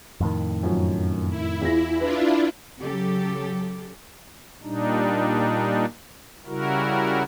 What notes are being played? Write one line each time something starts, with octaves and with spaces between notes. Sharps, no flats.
F2 A2 D#3
F#2 F3 F#3
E4
E2 F4 A#6
D4 E4 F4 B4
C#3 F#3 C#4 G4 A4
A#2 G3 D4 D#4
C#3 G3 E4 F#4 A#4